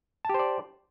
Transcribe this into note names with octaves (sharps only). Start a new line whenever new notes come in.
G4 C5 D5 A5